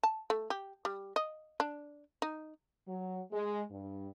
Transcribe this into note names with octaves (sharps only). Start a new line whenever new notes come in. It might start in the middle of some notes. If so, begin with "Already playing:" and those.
A5
A3
G4
G3
D#5
D4
D#4
F#3
G#3
G2